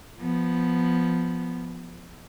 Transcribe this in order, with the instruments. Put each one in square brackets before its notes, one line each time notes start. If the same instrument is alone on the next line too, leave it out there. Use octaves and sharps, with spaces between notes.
[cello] F3 B3